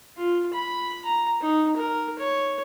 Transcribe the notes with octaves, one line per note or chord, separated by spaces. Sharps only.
F4
B5
A#5
D#4
A#4
C#5